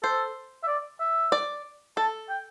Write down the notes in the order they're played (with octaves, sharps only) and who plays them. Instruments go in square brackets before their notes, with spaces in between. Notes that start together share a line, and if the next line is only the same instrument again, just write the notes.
[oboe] A4 [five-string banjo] C5
[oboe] E5
D5
E5
[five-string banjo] D5
[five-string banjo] A4 [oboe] A5
[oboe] G5